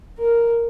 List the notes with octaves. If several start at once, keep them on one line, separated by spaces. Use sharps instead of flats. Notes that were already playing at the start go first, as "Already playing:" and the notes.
A#4